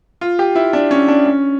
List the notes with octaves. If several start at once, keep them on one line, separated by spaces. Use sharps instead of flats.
F4
G4
E4
D4
C#4
D4
C#4